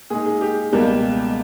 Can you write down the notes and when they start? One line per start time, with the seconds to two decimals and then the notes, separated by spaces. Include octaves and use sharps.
0.10 A#2 G#3 D#4 G#4
0.26 G#4
0.41 G4
0.73 C#2 B2 G3 A#3